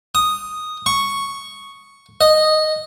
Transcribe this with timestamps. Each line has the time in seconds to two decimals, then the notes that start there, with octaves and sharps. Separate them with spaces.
0.15 D#6
0.86 C#6
2.21 D#5